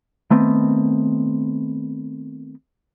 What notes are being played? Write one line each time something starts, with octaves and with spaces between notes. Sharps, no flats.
D#3 A3 B3 C4